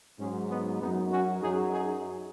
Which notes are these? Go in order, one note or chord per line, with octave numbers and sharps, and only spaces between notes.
G#2 F#3 G#3 C#4
B3 D#4
F#2 F#3 B3 D#4
C#4 F#4
F#2 F#3 D#4 G#4
D#4 G#4